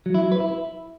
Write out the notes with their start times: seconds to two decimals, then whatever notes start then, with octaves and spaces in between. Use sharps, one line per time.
0.06 F#3
0.14 E4
0.23 F#3
0.32 B4
0.40 E4